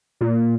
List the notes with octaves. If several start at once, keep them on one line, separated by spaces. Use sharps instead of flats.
A#2